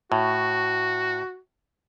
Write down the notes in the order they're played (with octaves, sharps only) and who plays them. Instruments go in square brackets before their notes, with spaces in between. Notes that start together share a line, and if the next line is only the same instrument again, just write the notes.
[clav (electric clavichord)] A2 [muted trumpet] F#4